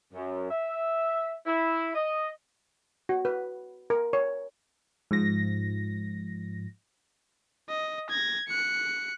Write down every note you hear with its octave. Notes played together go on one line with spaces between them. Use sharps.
F#2
E5
E4
D#5
F#4
B4
A#4
C#5
G#2 F3 A#6
D#5
G#6 A#6
F#6 C#7